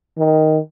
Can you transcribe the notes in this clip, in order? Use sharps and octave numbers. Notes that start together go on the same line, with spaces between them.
D#3